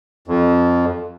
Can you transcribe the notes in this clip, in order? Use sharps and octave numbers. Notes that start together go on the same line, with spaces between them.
F2